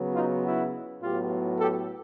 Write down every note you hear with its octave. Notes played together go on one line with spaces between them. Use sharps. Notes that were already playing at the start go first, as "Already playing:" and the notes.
Already playing: C#3 F#3 B3
D#4 F4
E4 F#4
A2 F#3 B3 F4 G4
G4 A4